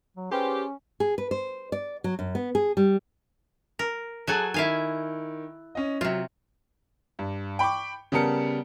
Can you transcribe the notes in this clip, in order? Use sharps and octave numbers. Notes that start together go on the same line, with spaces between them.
F#3
C#4 F4 G4 G#4 B4 C5
G#4
B4
C5
D5
F#3
F#2
B3
G#4
G3
A#4
F#3 G#4 A4 G#5 A5 F#6
D#3 E4 F5 G#5
C#4 D#5
C3 F#3 F4
G2
G5 B5 C#6 D6
C#3 G3 B3 A#4 A5 C#7